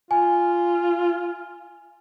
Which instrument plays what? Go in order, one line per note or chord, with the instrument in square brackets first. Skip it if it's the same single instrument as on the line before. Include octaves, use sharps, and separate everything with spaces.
[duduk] F4 [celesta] G#5